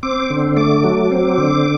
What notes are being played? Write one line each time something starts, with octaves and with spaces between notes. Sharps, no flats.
C4 D6
D3
A3 D6
F#3
C4
D3